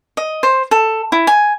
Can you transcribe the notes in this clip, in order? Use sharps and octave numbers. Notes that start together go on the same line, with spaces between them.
D#5
C5
A4
E4
G#5